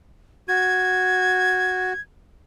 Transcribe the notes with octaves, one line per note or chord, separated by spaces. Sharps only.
F#4 G#6